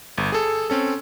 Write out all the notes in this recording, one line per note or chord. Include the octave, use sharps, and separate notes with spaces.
G1
G#4 A4
C4 C#4 A4